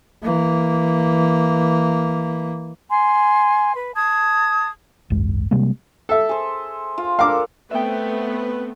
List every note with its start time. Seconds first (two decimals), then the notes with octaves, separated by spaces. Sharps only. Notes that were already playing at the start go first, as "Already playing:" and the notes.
0.23 E3 A#3
2.89 G#5 C6
3.75 B4
3.94 A5 D#6 G#6
5.10 G#1 C#2 F#2 G#3
5.51 C3 G3 G#3 A#3
6.09 A4 E5
6.29 G#4 C5
6.98 F4
7.19 D4 A4 A#4 F5 D6
7.71 A3 B3 C4 B4 E5 G5